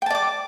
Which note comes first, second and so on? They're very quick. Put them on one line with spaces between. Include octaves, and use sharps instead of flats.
G5 A5 D5 D6